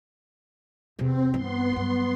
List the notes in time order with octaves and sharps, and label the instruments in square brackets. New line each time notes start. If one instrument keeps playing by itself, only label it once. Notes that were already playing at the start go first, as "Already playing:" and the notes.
[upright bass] E2 C3 [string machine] C4
[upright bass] G2 E3 [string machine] B3 C6
[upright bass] G2 F#3